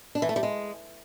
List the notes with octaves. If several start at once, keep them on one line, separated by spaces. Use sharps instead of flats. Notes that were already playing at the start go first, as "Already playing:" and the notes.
D4
E3
A3
G3
G#3